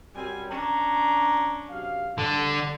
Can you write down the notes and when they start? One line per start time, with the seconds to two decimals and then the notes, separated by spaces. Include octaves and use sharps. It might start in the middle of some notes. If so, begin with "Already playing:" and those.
0.15 F#2 G3 C4 G#5
0.50 C#4 D4 A#5
1.70 F#2 C3 F5
2.18 D3 G3 D4